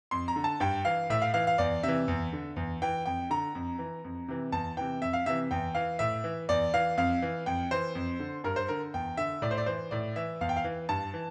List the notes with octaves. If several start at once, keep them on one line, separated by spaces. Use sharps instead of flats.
F2 C6
A#5
D3
A5
G2 G5
E3 F5
A2 E5
F5
E3 F5
F5
E2 D5
C3 E3 E5
E2
D3
E2
E3 G5
F2 G5
D3 A#5
F2
E3
F2
C3 E3
E2 A5
C3 E3 G5
F2 E5
F5
C3 E3 E5
E2 G5
E3 F5
A2 E5
E3
E2 D5
E3 F5
F2 F5
E3
F2 G5
E3 C5
F2
D3
G2 A#4
C5
D3 A#4
E2 G5
D3 E5
A2 D5
C5
D5
E3 C5
A2 D5
E3 E5
E2 F5
G5
F5
E3
G2 A5
E3